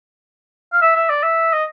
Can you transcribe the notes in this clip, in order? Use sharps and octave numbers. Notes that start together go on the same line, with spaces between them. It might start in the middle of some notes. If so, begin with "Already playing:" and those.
F5
E5
E5
D5
E5
D#5